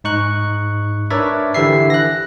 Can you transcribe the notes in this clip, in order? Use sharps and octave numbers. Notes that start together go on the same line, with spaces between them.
G#2 D#4 C#6 F#6
D4 A#4 B4 C#5 D5 E5
D3 E3 E4 G4 E5 C7
F#6 A#6